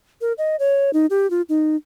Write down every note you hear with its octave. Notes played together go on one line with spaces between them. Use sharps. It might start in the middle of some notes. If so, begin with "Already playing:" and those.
A#4
D#5
C#5
D#4
G4
F4
D#4